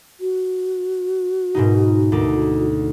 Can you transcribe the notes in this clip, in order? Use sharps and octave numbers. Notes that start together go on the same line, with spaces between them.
F#4
G#2 B2 D#4
D2 D#4 D6